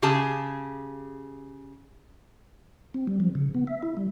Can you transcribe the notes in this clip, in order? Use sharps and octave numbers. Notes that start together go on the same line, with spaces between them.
C#3 G4 G#4 G#5 A5
C4
G3
F3
C#3
B3
E5
E4
G3